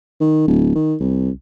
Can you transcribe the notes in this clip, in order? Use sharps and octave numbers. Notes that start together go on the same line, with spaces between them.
D#3
D1
D#3
C2